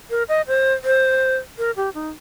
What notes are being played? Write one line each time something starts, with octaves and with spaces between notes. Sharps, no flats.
A#4
D#5
C5
C5
A#4
G4
D#4